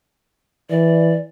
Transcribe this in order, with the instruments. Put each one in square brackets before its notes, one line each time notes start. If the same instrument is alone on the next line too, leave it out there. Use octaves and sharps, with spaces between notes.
[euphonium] E3 [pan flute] D5